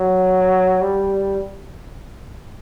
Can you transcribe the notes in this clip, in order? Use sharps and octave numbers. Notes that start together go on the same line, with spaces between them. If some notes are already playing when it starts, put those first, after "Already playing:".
Already playing: F#3
G3